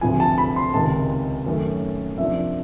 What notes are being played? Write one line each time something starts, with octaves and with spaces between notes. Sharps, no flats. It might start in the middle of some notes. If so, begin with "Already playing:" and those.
D2 C3 F3 G#5
A5
B5
C6
C#2 C3 D#3 G#3 A5
F#2 D#3 F#3 A3 C#4
C3 F3 A#3 D4 E5